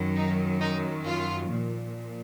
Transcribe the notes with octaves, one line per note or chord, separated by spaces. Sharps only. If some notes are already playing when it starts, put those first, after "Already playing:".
Already playing: F#2 D#3 F#3
D#4
D#4
F4
A#2 F3